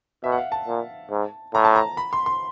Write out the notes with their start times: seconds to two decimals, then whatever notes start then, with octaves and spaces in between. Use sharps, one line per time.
0.24 B2 E5
0.32 F#5
0.38 F5
0.52 A5
0.67 A#2
1.10 G#2
1.54 A2 A#5
1.65 A5
1.76 A#5
1.97 B5
2.13 C6
2.26 C6